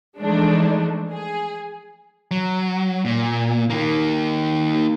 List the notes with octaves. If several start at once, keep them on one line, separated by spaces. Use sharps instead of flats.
E3 F3 G#3 A3 D4 D#4
G#4
F#3
A#2
D#3 A#3